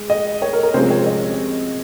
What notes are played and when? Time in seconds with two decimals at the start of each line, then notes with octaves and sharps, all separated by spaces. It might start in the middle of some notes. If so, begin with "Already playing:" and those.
Already playing: G#3
0.10 D#5
0.42 C#5
0.53 A#4
0.63 A#4
0.74 C3 F3 G#3 C#4 C5
0.90 C#5
1.06 D#5